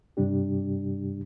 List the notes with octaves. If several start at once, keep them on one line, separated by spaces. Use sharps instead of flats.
G2 C3 G3 D4 G4